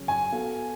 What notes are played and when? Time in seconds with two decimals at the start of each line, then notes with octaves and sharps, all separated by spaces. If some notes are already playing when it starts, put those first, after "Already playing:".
Already playing: C#3 F#3 C#4
0.08 G#5
0.31 B3 F#4 A4 F5